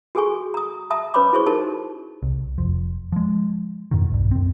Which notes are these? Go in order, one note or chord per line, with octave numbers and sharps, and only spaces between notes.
F#4 G#4 A4 G#5 C#6
A#5 D#6
E5 A5 A#5 D#6
C#4 B4 C#5 B5 C6 D6
E4 F#4 G#4 C5 C6 C#6
D#4 G4 A#4 A5
C2
F1 F3
F3 G#3
F2 G#2 B2 D#3
B1 G2
F#2 C4